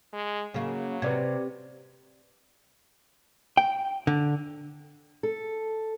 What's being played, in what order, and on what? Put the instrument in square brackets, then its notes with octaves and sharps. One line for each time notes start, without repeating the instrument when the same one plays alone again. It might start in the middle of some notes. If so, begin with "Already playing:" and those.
[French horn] G#3
[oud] C#3 A#3 [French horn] F#3
[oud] C3 [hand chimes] B4 D5 G#6
[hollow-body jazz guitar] G5
D3
[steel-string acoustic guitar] A4